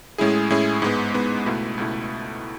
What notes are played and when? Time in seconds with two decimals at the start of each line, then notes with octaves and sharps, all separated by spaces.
0.18 A2 G#3 C#4 E4 G#4
0.50 A2 G#3 C#4 E4 G#4
0.82 G#2 G#3 B3
1.14 G#2 G#3 B3
1.46 C#2 B2 A3 E4
1.78 C#2 B2 A3 E4